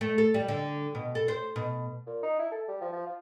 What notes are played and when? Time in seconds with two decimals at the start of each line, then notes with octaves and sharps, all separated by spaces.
0.01 A3
0.18 A4
0.34 G3
0.48 D3
0.95 B2
1.15 A4
1.28 C5
1.56 B2
2.07 A#2
2.23 D#4
2.39 E4
2.52 A4
2.68 G3
2.81 F3
2.92 F3
3.06 F4